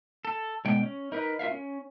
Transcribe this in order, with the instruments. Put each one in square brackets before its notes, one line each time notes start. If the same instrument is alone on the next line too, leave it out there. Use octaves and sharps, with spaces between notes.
[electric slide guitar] A4
B2 D3 G#3 G5
C#4
D#4 A#4 B4
F4 A#4 E5 F5
C#4